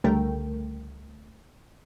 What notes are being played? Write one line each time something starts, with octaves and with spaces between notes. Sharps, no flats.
C#2 D3 G3 A3 A#4 G5